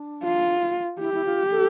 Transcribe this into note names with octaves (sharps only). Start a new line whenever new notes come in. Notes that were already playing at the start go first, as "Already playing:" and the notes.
Already playing: D4
F4
E4 G4
E4
F4
A4